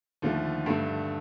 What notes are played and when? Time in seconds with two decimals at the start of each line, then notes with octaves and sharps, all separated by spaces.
0.22 D#2 D3 F3 A3
0.66 G2 D3 A3